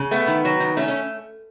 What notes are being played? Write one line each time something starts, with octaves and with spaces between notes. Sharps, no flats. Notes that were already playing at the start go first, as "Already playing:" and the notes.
Already playing: C#3
A3 B3
D#3
F#3
D#3
A3 C#4
C#4